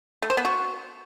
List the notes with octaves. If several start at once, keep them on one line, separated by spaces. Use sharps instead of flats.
A3
C5
B3
F#4